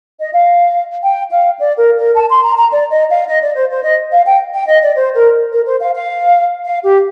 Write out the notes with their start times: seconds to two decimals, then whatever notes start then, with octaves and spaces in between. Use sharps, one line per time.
0.19 D#5
0.33 F5
1.03 G5
1.31 F5
1.59 D5
1.78 A#4
1.97 A#4
2.15 A5
2.30 C6
2.43 A#5
2.57 A#5
2.71 D5
2.90 D#5
3.09 F5
3.27 D#5
3.41 D5
3.55 C5
3.70 C5
3.83 D#5
4.11 F5
4.26 G5
4.54 G5
4.67 D#5
4.81 D5
4.96 C5
5.15 A#4
5.51 A#4
5.66 C5
5.80 F5
5.94 F5
6.64 F5
6.83 G4